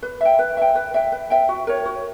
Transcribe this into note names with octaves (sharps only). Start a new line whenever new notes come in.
B4
E5 G5
B4
E5 G5
B4
E5 G5
B4
E5 G5
F#4
A#4 C#5
F#4